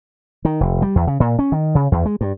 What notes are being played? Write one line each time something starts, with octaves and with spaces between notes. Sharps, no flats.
D#3
F1
G3
E2
C#3
A#2
C#4
D#3
C#3
E2
G#3
G2